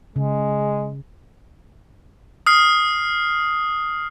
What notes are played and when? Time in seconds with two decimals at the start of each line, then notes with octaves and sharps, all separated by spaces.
0.16 C#3 G#3
2.46 D#6 F6 C7